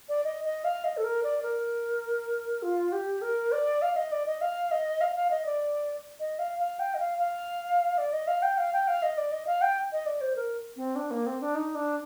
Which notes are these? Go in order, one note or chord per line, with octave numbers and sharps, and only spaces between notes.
D5
D#5
D#5
F5
D#5
A4
A#4
D5
A#4
F4
G4
A#4
D5
F5
D#5
D5
D#5
F5
D#5
F5
F5
D#5
D5
D#5
F5
F5
G5
D#5
F5
F5
D5
D#5
F5
G5
F5
G5
F5
D#5
D5
D#5
F5
G5
D#5
D5
C5
A#4
C4
D4
A#3
C4
D4
D#4
D4